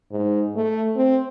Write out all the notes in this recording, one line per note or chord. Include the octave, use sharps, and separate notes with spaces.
G#2
A3
C4